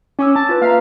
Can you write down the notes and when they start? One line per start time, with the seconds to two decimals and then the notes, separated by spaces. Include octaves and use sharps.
0.19 C#4 G#5 D6 E6
0.36 A5
0.49 F4 B4
0.61 A#3 E5 F5 A#5